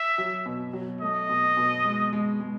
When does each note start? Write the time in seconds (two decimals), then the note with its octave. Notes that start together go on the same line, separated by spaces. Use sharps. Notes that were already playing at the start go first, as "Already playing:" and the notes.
Already playing: E5
0.18 F#3
0.46 B2
0.73 F#3
1.01 A3 D#5
1.29 B2
1.57 B2
1.85 G#3
2.13 G#3
2.40 G#3